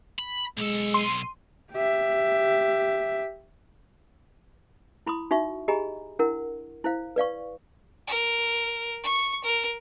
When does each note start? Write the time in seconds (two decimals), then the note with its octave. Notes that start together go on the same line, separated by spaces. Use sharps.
0.19 B5
0.57 B1 G#3 A4
0.94 C6 D#7
1.72 G4 E5
5.06 E4 B5 C6 D#6
5.31 D#4 F#4 E5 C#6
5.68 G4 G#4 D#5 G#5 A#5 B5
6.19 D4 E4 A#4 F#5
6.84 E4 C5 F5
7.16 B4 D5 F5 C#6
8.07 A#4
9.03 C#6
9.44 A#4